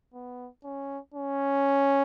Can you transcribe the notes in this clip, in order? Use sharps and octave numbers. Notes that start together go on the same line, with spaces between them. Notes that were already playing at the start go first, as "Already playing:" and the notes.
B3
C#4
C#4